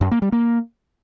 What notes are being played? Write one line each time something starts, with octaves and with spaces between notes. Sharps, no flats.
F#2
A#3
G3
A#3